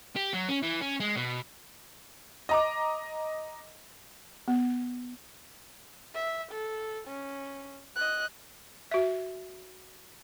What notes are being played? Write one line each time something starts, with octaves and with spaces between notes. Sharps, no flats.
G4
F#3
C#4
E3
C#4
G#3
B2
D#5 A#5 D6
B3
E5
A4
C#4
D#5 F#6
F#4 E5